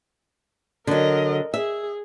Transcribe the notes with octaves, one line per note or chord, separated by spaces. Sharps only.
D3 F#3 A#4 D#5
G#4 E5